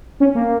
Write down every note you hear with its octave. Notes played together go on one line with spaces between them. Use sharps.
C#4
A#3